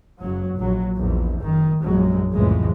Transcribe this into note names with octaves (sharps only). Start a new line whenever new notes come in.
F#1 F#3
A#1 F#3
A#1 E2
F#1 D#3
A#1 F#2 F#3 G#3
C2 F2 A2 C#3 E3 G#3